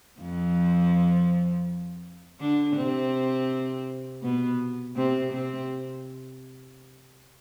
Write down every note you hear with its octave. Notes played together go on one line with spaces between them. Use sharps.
F2 F3
D3 D4
C3 C4
B2 B3
C3 C4
C3 C4